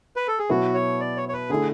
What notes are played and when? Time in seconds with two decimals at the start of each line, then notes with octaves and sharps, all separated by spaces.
0.16 B4
0.28 A4
0.39 G#4
0.50 B2 F#3 B3 E4 F#4 B4
0.74 C#5
1.00 D5
1.17 C#5
1.29 C#5
1.33 B4
1.50 D3 A3 E4 G#4